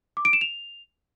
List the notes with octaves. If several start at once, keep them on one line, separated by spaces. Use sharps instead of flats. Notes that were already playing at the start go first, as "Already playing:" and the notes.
D6
D7
E7
F7